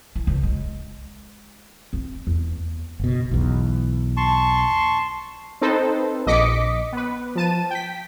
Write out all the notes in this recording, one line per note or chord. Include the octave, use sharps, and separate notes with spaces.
E3
C#2
G#3
C4
E2
F#1 B2
B1 E2
A5 C6 C#6
C4 D#4 A4 B4 C5
A#1 D#5 D6 B6 C#7
B3 B4
F3 A5 D#7
G5 B6